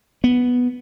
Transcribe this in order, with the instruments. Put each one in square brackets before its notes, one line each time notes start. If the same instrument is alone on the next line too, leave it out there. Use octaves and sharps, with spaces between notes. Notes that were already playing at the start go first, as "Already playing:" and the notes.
[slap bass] B3